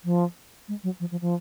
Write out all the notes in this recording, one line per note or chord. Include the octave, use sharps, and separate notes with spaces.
F3
G#3
F#3
F3
F3
F3